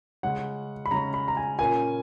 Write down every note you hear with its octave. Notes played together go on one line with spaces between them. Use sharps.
C#3 G#3 C#4 F#5
B5
C#3 G#3 C#4 A#5
B5
A#5
G#5
A#2 A#3 C#4 G#5